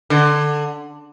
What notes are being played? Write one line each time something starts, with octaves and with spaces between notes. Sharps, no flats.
D3